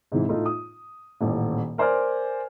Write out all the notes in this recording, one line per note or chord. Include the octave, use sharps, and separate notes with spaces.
G#2 C3 E3
A2 A3 D#4 F4
D#6
D#1 A1
A#4 C5 D5 G#5 F6